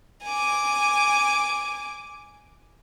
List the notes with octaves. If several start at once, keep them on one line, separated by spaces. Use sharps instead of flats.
G#5 D6